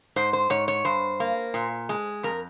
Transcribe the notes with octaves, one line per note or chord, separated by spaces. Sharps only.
G#2 C5
C5
G#2 C#5
C#5
G2 C5
A#3
A#2
G#3
F2 A#4